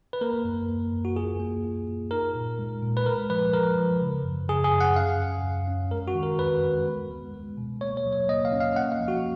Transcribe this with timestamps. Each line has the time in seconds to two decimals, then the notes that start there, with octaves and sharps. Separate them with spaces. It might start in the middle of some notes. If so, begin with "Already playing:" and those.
0.13 B4
0.21 A#3 A#4
0.45 F#2
0.69 A#3
0.93 F#2
1.05 F#4
1.16 F4 G#4
1.40 A#3
1.64 F4
1.88 F4
2.11 D#4 A#4
2.35 A#2
2.59 G#3
2.82 A#2
2.97 B4
3.06 G#3 A#4
3.30 F3 B4
3.53 F3 A#4
3.77 F3
4.02 C#3
4.25 F#2
4.49 C#3 G#4
4.64 G#4
4.73 F#2
4.80 F#5
4.96 C#4 F5
5.20 F#2
5.44 F#2
5.67 C#4
5.91 G#3 A#4
6.08 F#4
6.15 D#3
6.23 A#4
6.39 F2 B4
6.63 G#3
6.87 B3
7.10 G#3
7.34 G#3
7.57 B2
7.81 A#3 C#5
7.97 C#5
8.06 F#3
8.13 C#5
8.29 A#3 D#5
8.45 F5
8.52 C#4
8.60 F5
8.76 A#3 F#5
8.92 F5
9.00 F3
9.08 F#4